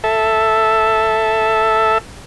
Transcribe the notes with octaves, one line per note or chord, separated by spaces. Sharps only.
A4 E5